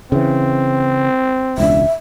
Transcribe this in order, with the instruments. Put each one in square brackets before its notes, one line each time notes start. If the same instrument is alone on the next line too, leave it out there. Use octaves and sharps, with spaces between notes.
[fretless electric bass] C#3 E3 [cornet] C4
[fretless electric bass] E1 C#2 D4 [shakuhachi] E5